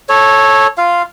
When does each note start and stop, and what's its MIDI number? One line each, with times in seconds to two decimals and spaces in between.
0.09 0.67 69
0.09 0.67 73
0.78 1.02 65
0.78 1.02 77